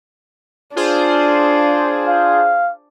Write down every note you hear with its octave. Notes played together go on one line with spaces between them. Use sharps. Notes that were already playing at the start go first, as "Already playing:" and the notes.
D4 F4 G#4 C5
F5